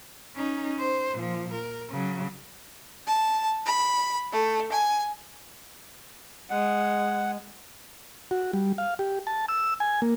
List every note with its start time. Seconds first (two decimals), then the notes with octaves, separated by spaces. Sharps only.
0.36 C#4 D#4
0.79 C5
1.14 A#2 F3
1.54 A#4
1.90 C#3 F#3
3.07 A5
3.65 B5
4.32 A3
4.70 G#5
6.50 G#3 F#5
8.31 F#4
8.54 G3
8.78 F5
8.99 G4
9.27 A5
9.49 E6
9.80 G#5
10.02 A#3